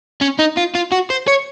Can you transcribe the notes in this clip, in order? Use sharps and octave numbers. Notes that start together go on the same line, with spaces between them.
C#4
D#4
F4
F4
F#4
C5
C#5